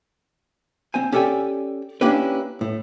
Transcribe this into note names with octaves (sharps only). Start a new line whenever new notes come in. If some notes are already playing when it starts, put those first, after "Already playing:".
C4 C5 G#5
C#4 G4 A4 D5 G5 G#5
A#3 C#4 D4 E4 G4 B4
A2